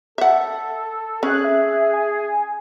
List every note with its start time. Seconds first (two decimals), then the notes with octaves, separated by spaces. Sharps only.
0.18 A4 E5 F#5
1.23 C#4 G#4 F#6
1.44 E5
1.93 G#5